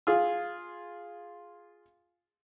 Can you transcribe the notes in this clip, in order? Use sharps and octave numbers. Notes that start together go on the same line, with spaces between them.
F4 G#4